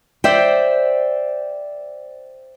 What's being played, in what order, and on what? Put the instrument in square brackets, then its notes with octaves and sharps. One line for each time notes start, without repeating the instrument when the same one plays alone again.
[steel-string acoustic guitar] C5 D5 E5 G5